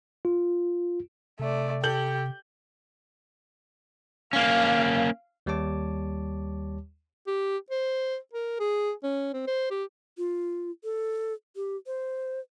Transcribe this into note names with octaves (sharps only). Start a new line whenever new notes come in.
F4
C3 A3 D5
G4 A4 G6 F#7
A#3 C#4 F5
D#2 G3 G4 C#5 A5 D6
G4
C5
A#4
G#4
C#4
C4
C5
G4
F4
A4
G4
C5